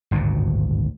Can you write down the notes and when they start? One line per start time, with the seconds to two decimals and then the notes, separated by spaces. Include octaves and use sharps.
0.11 G#1 D2 G2 A#2